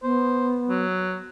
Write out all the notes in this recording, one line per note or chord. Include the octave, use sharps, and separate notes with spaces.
B3 C5
F#3